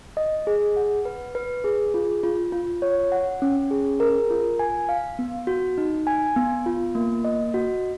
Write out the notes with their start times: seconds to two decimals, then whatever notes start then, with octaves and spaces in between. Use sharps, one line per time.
0.17 D#5
0.47 G#4
0.76 F#5
1.05 B4
1.35 B4
1.64 G#4
1.94 F4
2.24 F4
2.52 F4
2.82 C#5
3.12 F#5
3.42 C#4
3.71 G#4
4.00 A#4
4.30 F4
4.59 G#5
4.89 F5
5.19 B3
5.47 F#4
5.78 D#4
6.07 G#5
6.36 B3
6.66 F4
6.95 A#3
7.24 D#5
7.54 F#4